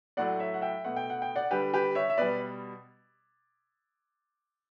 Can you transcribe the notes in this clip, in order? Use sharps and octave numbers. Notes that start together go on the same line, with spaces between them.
A2 F#3 A3 D5 F#5
C#5 E5
F#5
E5 G5
B2 A3 F#5
G5
F#5
G5
D5 F#5
D3 G3 G4 B4
G4 B4
C#5 E5
E5
B2 G3 B4 D5